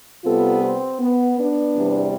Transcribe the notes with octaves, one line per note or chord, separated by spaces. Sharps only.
C3 G3 B3 F4 A4
C4
B3
B3 D4
E2 C3 G3